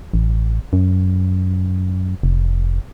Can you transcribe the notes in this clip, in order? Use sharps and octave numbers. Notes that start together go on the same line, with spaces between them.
A1
F#2
F1